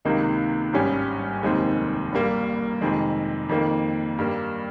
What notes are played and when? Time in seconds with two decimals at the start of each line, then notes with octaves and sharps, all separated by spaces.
0.05 C#2 C3 D#3 A#3 D#4
0.73 G#1 G2 G3 C#4 G4
1.42 F1 D#2 D#3 G#3 C4
2.12 G1 G2 G3 A#3
2.81 F2 C3 D#3 G#3
3.49 F2 D#3 A#3
4.19 G2 G3 A#3